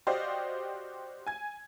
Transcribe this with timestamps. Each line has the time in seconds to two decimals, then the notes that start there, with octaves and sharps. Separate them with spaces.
0.07 F#4 G4 C5 D5 D#5 F5
1.27 G#5 G#6